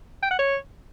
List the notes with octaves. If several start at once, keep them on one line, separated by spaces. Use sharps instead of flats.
G5
F#5
C#5